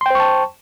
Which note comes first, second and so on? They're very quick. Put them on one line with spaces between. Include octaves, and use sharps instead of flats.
C6 G5 C5 C#6 A5